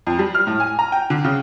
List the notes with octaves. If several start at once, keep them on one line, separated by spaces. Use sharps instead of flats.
F2
G3
F6
A2
G#5
A#5
G5
D3
C#3